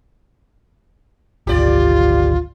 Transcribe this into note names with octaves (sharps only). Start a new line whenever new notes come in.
G#1 D2 F4 G4 D5